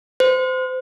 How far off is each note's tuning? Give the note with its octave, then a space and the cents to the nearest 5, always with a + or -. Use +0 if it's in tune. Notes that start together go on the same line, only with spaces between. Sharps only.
C5 -25